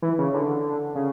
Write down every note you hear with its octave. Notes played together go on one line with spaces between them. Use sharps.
E3
C#3
D3
C#3